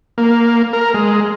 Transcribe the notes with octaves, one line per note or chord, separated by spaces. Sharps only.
A#3
A#4
G#3